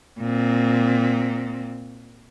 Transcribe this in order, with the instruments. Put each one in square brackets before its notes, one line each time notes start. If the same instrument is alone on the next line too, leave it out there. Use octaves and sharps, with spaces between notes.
[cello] A#2 C4